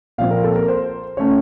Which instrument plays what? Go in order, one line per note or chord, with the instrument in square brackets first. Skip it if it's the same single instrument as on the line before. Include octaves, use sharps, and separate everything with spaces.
[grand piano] A#2 F3 C4 F5
A#4
A4
A#4
C5
C#3 A3 C#4 C#5